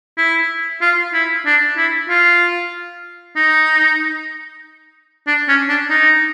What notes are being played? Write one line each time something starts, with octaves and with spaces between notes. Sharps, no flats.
E4
F4
E4
D4
E4
F4
D#4
D4
C#4
D4
D#4